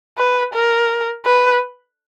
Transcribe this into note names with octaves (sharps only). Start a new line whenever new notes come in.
B4
A#4
B4